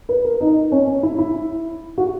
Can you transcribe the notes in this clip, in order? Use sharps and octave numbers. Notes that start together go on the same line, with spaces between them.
B4
A#4
D#4
C#4
C#4
E4
E4
F#4